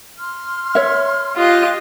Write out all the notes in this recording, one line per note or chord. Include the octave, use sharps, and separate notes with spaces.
C6 F6
C#5 E5
F4 G4 D#5 F5 F#6